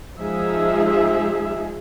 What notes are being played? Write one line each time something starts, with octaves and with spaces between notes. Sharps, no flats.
F3 G#3 D#4 G#4 E5